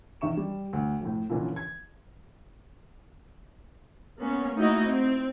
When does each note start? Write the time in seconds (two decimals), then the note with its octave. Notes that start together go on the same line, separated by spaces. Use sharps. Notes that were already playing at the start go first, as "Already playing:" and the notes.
0.21 E2 D#3 E5 C#6 E7
0.37 G3
0.73 D2
1.01 F2 A2
1.30 A#2 D3 E3 F3 C#4
1.56 G#6
4.18 A#3 B3 C#4
4.56 A3 A#3 D#4 E4 F#4 D#5
4.87 C4